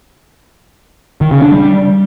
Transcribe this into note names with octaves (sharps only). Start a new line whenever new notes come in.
D#3
C#3
D4
G3